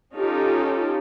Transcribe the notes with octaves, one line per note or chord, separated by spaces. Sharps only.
C#4 D#4 F4 G4 A4